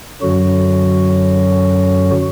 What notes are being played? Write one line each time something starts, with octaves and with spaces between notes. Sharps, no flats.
F#2 D3 F#3 F#4